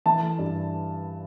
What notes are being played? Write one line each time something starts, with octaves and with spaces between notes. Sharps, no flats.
E3 A5
A3
G2